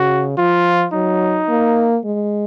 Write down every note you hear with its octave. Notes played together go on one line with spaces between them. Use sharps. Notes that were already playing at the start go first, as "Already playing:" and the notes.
Already playing: C#3 F#4
F3 F4
F#3 D#4
A#3
G#3